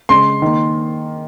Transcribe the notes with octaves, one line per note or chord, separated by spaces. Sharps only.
C#3 G#3 C6
D#3 A#3